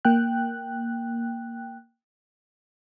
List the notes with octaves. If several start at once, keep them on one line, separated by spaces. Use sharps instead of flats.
A#3 G5 F#6